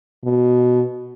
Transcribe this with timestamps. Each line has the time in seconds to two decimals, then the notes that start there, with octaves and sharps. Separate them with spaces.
0.24 B2